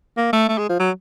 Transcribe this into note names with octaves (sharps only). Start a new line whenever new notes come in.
A#3
A3
A3
G#3
F3
F#3